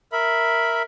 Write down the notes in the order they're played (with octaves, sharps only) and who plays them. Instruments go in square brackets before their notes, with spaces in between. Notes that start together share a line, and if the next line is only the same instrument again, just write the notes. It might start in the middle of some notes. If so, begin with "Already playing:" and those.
[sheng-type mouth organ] A#4 E5 B5